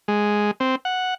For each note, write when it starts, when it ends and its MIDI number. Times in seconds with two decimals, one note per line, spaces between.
0.08 0.51 56
0.60 0.76 60
0.85 1.14 78